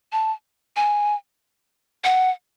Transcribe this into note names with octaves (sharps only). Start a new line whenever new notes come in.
A5
G#5
F#5